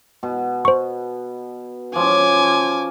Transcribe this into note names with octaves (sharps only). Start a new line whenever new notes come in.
B2
C5 C#6
F3 C#4 G#5 D6